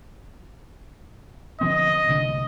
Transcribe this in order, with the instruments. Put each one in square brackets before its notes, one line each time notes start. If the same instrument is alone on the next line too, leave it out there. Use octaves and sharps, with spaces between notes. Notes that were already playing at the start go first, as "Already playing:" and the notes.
[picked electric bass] D3 F3 C4 [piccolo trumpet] D#5
[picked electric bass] C2 D3